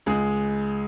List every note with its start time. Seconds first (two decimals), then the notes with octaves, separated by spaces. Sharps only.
0.06 C#2 G#3 G#4